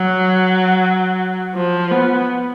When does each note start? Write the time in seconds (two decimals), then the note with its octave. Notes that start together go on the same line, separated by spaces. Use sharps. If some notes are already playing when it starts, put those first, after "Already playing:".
Already playing: F#3
1.55 F3
1.91 B3